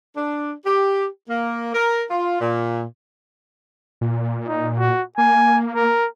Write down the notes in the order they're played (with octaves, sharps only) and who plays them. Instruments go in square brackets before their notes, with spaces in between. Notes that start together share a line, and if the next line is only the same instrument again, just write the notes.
[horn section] D4
G4
A#3
A#4
F4
A#2
[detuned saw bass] A#2
[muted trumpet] D#4
F#4
[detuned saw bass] A#3 [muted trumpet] G#5
[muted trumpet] A#4